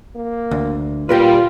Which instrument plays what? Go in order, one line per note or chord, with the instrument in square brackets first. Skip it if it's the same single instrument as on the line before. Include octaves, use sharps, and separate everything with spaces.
[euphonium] A#3
[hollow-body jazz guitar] D2
[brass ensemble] A#2 G3 [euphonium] A#3 [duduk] F4 [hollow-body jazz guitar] G4 A#4 B4